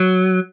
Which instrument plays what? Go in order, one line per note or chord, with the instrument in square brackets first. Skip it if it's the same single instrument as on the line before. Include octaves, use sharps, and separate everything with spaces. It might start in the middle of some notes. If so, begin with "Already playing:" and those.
Already playing: [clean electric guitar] F#3